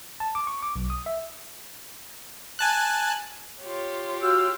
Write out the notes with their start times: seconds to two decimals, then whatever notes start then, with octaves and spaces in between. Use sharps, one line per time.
0.20 A5
0.35 D6
0.47 C#6
0.62 D6
0.76 B1
0.90 D#6
1.06 E5
2.59 G#5 A5 F#6
3.62 F4 G4 C#5
4.23 F#4 F5 G5 E6